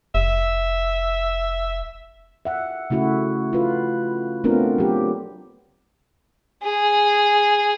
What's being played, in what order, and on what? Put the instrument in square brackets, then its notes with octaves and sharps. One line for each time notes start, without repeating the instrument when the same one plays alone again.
[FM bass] F1 [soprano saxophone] E5
[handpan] E5 F#5
C#3 A3 E4 F#4
F4 B4
A3 B3 C4 D4 F4 A#4
F#3 G4
[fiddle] G#4